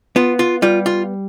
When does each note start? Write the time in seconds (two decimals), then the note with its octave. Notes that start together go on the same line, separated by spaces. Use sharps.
0.16 B3 F4
0.39 F4
0.62 G3 F4
0.86 F4